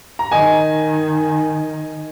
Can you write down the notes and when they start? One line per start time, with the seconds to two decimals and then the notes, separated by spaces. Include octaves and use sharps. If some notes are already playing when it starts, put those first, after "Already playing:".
0.19 A#5
0.32 D#3 D#5 G#5